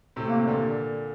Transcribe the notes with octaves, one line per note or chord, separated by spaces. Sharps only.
A2 C3
A#3
C3
A#2 D3